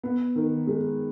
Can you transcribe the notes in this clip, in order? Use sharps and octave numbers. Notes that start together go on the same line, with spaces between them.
B3
D#3
G#3